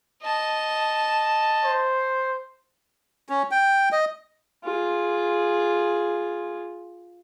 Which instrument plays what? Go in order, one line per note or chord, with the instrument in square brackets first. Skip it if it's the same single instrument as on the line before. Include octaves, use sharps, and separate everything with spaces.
[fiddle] D#5 A5
[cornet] C5
[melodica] C#4
G5
D#5
[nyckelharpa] F4 G#4